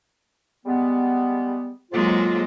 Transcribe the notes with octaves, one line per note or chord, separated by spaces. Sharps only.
G3 G#3 B3
F2 G#2 F#3 G#3 A#3 F4